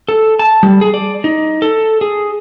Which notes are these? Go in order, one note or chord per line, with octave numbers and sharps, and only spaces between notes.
A4
A5
G3
G#4
D5
D#4
A4
G#4